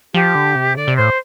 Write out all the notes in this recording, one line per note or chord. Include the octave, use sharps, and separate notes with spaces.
F3 G4
D3
C3
D3 D5
C3
A2 C5